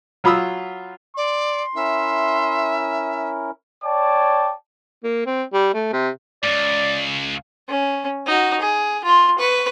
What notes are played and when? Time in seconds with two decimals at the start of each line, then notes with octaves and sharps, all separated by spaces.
0.24 F#3 F4 B5 D#6 E6
1.17 D5 C6
1.76 C#4 E4 A#4 E5
3.85 C#5 D5 G5 A5 D6
5.04 A#3
5.26 C4
5.53 G3
5.74 A3
5.93 C3
6.43 C#2 G#2 D5
7.69 C#4
8.26 D#4 F#4
8.60 G#4
9.04 F4 C6
9.38 B4 C#6